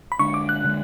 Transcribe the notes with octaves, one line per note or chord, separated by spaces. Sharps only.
B5
D3 G#3 D4 C#6
D6
F#6
D3 G#3 D4